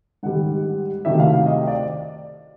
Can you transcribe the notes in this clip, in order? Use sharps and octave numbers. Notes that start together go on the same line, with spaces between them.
G#2 D#3 G3 F#5
C3 D#3 F#3 A3 E5
F5
F5
D#5
D5